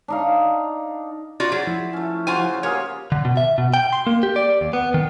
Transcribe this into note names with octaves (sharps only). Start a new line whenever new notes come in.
D4 D#4 F5
F4 F#4 C5 D5
F#3 G#4
F3 E4
A3 C#4
C#3 C#4 F4 F#4 C5 G#5
A#3 F4 G4 G#4 C#5
D3
B2
E5
B2
G5
C6
A#3
G4
D5
D#2
B3
D#3